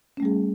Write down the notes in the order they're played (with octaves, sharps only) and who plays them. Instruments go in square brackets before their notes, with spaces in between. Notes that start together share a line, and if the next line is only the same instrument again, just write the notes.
[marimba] C#4
A3
G3
G#4